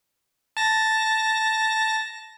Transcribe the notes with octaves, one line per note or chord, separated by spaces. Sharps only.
A5 A#6